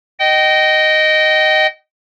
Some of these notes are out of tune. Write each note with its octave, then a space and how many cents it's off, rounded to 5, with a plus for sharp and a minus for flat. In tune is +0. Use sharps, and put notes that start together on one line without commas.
D#5 -5 G5 -30